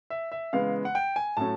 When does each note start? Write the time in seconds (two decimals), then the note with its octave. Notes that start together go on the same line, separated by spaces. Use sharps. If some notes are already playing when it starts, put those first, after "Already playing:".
0.10 E5
0.32 E5
0.53 C#3 E3 G#3 B3 F5
0.85 F#5
0.95 G5
1.16 G#5
1.37 A2 F#3 A3 C#4 A5